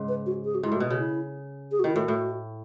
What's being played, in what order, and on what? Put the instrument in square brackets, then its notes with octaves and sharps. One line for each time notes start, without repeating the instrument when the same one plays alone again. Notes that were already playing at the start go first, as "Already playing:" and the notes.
Already playing: [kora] G#2 C#3
[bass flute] B4
F#4
G#4
F#4
[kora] G#2 [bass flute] E4
[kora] A2 [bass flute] F#4
[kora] B2
[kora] C#3 [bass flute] F#4
[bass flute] E4
G#4
F#4
[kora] D#3 [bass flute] E4
[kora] A2 [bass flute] F#4
[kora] A2